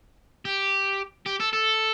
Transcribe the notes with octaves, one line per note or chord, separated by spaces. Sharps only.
G4
G4
A4
A4